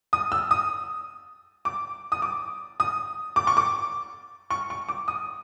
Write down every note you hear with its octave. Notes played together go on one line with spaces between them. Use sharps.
D#6
E6
D#6
D6
D#6
D6
D#6
D6
C#6
D6
C#6
C#6
D6
D#6